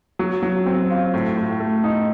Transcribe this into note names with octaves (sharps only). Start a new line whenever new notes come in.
F#3
F#3
C4
F4
A2
A2
A3
D#4